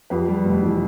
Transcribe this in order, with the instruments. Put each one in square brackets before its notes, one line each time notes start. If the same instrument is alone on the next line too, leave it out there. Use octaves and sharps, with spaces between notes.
[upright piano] F2 G4 B4
G3
F1
E3